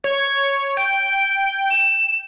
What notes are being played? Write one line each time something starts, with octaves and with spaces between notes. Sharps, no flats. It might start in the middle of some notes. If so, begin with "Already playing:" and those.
C#5 G#6
G5 D7
E7